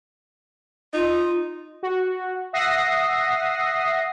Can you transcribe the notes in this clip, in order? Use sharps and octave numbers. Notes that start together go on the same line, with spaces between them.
D#4 F4
F#4
E5 F#5 D#6 A#6 C7